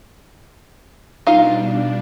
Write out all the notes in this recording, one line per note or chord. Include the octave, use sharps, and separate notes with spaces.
B2 G3 D4 D#4 F4 F5